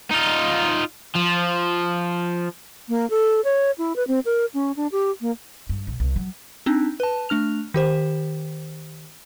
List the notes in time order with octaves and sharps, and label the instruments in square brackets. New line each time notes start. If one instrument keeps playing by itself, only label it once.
[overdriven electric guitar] D#4 F4
F3
[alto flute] A#3
A4
C#5
E4
B4
C4
A#4
C#4
D4
G4
A#3
[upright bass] G2
B1
C2
F#3
[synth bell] C4 D4 D#4
B4 A5
A3 D4 F6 F7
D#3 G4 C5